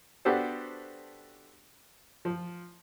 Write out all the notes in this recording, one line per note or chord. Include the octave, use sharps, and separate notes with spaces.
B3 D4 F#4 G4 A4 C5
F3